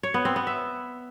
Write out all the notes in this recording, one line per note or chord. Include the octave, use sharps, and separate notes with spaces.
C#5
B3
C4
B3
E5